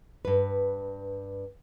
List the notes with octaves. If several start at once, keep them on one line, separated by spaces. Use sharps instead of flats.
G2 B4